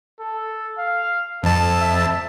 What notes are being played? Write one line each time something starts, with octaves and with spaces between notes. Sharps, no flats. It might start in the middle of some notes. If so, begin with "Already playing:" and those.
A4
F5
F2 A4 A5
E5